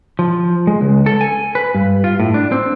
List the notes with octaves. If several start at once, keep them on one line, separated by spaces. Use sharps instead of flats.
F3
G#3
C#2
A4
G#5
B4
G2
F4
A2
D4
C4